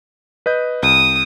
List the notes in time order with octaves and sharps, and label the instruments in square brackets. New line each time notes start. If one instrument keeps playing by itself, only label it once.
[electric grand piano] B4 D#5 G6
[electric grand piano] C2 [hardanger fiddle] D#6